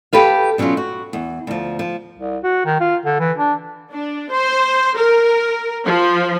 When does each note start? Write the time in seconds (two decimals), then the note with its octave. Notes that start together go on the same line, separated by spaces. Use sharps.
0.13 G4 A4 B4 F5
0.58 B2 F#3 C#4 D4 F4
0.77 F#4
1.13 E2
1.47 D2 F3
1.79 F3
2.18 C2
2.43 F#4
2.66 D#3
2.80 F4
3.05 D3
3.19 E3
3.38 D4
3.92 D4
4.31 C5
4.97 A#4
5.85 F3